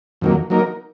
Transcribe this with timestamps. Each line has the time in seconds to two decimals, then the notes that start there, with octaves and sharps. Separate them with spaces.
0.21 F2 D#3 F#3 A#3
0.50 F#3 A#3 D#4 A#4